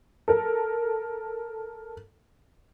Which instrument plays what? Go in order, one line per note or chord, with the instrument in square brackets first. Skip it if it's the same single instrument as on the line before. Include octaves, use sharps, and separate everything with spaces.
[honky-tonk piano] A4 A#4